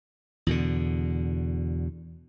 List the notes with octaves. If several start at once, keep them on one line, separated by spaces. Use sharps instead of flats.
E2 B2 D3